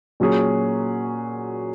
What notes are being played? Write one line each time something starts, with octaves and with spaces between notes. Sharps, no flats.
A#2 F#3 C#4 G#4